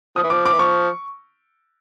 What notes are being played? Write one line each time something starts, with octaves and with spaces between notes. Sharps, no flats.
F3 D#6
E3
F3 D6
D6
E3
F3 C#6